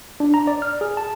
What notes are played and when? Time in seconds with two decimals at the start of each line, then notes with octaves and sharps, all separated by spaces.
0.20 D4
0.34 A#5
0.47 D5
0.62 F6
0.81 G#4
0.97 A5